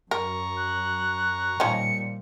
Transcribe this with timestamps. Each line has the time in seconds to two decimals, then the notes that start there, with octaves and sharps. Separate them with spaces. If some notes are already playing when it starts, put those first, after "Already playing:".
0.11 F#2 F#3 A#4 A#5 C#6
0.57 F#6
1.60 A#2 D#3 F3 G3 C#4 C#7